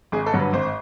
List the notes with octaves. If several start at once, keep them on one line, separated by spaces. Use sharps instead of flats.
G#1 G#4
A4
G2 D3 F#3
B4
G#1 C5